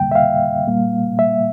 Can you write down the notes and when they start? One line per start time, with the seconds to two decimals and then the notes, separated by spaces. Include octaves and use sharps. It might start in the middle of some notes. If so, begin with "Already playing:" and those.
Already playing: F2 D3 G3 A#3 G5
0.12 E5
0.15 F5
0.67 A#2 G3 A#3
1.19 E5